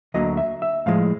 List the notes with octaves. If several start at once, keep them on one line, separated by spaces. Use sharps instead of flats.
D2 D3 F#3 A#3 D#5
E5
E5
A2 F3 G#3 F5